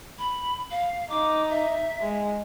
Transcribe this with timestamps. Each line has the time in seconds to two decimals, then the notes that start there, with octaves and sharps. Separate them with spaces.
0.19 B5
0.71 F5
1.10 D#4 D6
1.50 E5
2.00 G#3